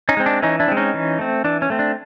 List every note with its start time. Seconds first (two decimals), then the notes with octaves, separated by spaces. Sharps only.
0.09 C#4 D#4
0.17 G#3 C4
0.26 D4
0.42 E3 C#4 D#4
0.60 D4 E4
0.68 G#3 C4
0.77 C#4 D#4
0.94 E3
1.19 A3 C4
1.44 E3 D4
1.62 C#4
1.70 A3 C4
1.79 D4